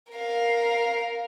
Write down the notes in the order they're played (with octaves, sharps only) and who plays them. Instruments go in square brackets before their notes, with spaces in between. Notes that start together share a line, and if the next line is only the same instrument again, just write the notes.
[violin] A#4 F5